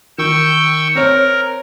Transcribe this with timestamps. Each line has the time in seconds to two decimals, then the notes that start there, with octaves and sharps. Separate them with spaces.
0.18 D#3 G5 C#6 E6
0.95 C4 A#4 C#5